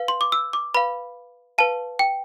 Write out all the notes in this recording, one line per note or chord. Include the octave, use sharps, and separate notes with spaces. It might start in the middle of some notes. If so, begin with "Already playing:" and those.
Already playing: B4 F5
C6
D6
E6
D6
B4 F5 B5
B4 F5 A5
G5